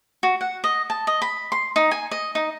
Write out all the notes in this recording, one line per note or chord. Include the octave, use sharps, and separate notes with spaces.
F#4
F#5
D#5
A5
D#5
B5
C6
D#4
G#5
D#5
D#4